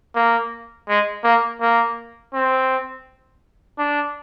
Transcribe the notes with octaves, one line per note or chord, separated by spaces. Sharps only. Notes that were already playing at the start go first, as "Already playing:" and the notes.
A#3
G#3
A#3
A#3
C4
D4